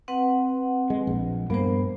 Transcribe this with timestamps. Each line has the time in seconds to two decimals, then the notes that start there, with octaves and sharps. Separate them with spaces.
0.08 C4 B4 F#5
0.90 G#3
1.07 A#1
1.50 G2 A#3 B3 C5